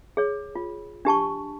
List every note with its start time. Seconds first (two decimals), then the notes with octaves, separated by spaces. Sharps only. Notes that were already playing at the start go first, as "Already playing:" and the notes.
0.17 G#4 C#5
0.55 F4
1.05 D4 G4 A5 C#6